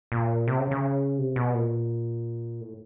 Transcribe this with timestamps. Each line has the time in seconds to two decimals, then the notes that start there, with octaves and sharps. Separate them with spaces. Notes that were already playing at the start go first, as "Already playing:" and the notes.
0.12 A#2
0.48 C3
0.59 C#3
0.71 C#3
1.18 C3
1.36 B2
1.54 A#2
2.61 A2